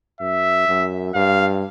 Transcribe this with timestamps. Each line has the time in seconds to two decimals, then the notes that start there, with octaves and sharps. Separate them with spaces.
0.21 F#2 E5
0.68 F#2
1.14 G2 F5